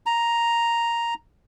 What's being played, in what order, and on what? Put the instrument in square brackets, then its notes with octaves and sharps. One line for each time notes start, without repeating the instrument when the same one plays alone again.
[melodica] A#5